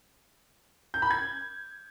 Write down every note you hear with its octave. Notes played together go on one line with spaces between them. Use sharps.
G6
B5
G#6